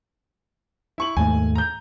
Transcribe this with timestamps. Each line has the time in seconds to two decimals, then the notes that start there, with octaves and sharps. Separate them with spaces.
0.98 E4 C#6 F#7
1.17 D#2 G#2 A3 G#5
1.56 A#5 G6